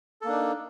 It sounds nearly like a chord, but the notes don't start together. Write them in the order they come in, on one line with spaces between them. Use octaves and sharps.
A4 A#3 D4 D#4